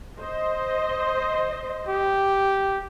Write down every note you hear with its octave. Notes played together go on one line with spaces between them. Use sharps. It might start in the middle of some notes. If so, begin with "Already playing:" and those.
C5 D#5
G4